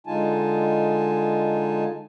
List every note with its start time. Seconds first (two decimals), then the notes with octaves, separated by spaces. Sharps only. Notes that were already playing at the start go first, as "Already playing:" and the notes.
0.07 D3 G#3 D#4 F4 G#5 A5